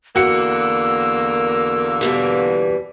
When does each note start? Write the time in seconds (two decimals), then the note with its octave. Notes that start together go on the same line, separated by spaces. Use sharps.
0.16 E2 D3 A#3 F#4 E6 C#7
2.01 B2 E3 G3